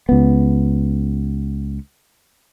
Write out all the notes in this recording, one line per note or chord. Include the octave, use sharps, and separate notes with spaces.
C#2 B3